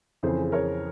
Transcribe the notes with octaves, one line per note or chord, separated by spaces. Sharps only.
F2 C#3 E3 G#4 C5
A#4 C#5